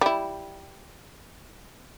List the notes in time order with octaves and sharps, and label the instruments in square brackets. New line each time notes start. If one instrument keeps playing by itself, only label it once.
[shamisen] G3 E4